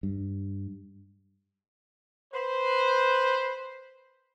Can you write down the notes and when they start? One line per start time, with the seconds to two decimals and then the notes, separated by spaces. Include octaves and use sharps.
0.03 G2
2.33 B4 C5